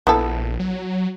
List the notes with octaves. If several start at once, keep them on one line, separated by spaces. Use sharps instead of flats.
A#1 B3 E4 A4
F#3